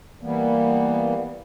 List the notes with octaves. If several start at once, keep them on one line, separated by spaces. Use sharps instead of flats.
E3 G3 A#3 B3